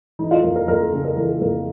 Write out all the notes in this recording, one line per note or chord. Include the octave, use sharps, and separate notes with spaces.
E3 D#4
F4
F2 A#4
A#4
F2 A#4
A4
C#3 G#4
A#4
E3 A#4
F2 A#4